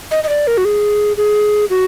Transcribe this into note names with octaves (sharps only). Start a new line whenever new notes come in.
D#5
D#5
D5
A#4
F#4
G#4
G#4
F#4